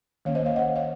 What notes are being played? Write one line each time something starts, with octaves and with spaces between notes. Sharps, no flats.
D#3 A#3 C#4 C#5 F5
C5 D#5
C#5 F5
D#5 F#5
C#5 F5